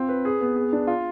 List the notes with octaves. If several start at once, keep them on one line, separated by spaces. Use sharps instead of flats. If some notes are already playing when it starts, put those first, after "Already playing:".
Already playing: C4 F4
B4
G#4
B3
G#4
D4
F4